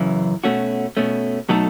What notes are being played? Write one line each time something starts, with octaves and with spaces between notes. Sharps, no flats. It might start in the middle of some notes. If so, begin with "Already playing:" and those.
Already playing: F#2 C#3 E3
B2 A3 C#4 F#4
B2 A3 C#4
B2 F#3 A3 D#4 A4